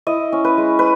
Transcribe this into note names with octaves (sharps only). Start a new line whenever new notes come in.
E4 D#5
C#4
B4
G#3
B4